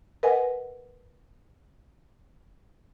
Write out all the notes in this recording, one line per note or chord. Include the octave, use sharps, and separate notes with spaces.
A#4 B4 D#5 F#5 G#5